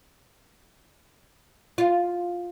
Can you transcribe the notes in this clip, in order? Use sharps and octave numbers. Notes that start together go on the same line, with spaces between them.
F4